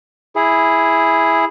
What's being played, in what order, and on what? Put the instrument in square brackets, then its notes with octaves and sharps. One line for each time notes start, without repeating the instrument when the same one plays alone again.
[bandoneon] E4 G#4